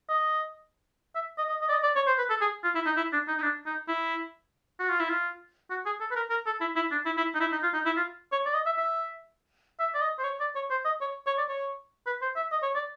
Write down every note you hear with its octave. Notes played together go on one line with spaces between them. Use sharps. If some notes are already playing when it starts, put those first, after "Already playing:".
D#5
E5
D#5
D#5
D#5
D5
D#5
D5
C#5
C5
B4
A4
G#4
F4
E4
D#4
E4
D4
D#4
D#4
D4
D#4
E4
F#4
F4
E4
F4
F#4
G#4
A4
B4
A#4
A#4
A4
E4
E4
D4
E4
E4
D#4
E4
D#4
F4
D#4
E4
F4
C#5
D5
D#5
E5
E5
E5
D5
D#5
C5
C#5
D5
C#5
C5
D#5
C#5
C#5
D5
C#5
B4
C5
E5
D#5
C#5
D5